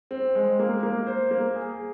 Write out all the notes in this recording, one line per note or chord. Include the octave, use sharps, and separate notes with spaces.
C4
G#3
A#3
A#3
C5
A#3
G#4